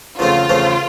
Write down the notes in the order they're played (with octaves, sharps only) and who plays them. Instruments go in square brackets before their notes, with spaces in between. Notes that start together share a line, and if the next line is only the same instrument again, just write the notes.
[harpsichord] E2 C#3 F3 A3 C4 [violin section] F4
[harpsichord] E2 C#3 F3 A3 C4